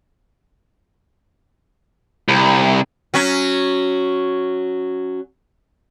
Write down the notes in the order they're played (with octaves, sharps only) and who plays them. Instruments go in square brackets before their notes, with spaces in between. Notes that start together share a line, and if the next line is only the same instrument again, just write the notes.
[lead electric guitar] C2
[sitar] F#3 C#4